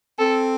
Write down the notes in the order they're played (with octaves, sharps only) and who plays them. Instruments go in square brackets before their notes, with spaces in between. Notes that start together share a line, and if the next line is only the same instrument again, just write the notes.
[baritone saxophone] C4 [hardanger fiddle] A4